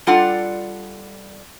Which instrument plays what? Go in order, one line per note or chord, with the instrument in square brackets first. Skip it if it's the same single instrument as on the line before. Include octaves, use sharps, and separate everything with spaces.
[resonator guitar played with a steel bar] G3 D4 F4 A4 D5 F#5